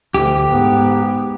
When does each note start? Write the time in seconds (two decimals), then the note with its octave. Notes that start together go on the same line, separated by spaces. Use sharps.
0.14 D2 G4
0.49 G#2 B3